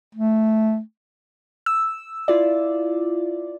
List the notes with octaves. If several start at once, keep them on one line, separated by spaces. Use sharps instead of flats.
A3
E6
E4 F4 D5